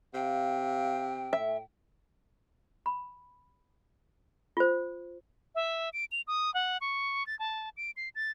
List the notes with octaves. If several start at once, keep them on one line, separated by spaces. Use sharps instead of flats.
C3 F5 G5
A2 E5
B5
F4 C5
E5
D7
F7
D#6
F#5
C#6
A6
A5
D7
C7
A6